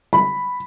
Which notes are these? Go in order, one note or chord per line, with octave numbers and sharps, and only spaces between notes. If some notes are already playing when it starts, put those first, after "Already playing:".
B5